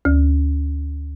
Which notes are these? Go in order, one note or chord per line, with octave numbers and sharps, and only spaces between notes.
D2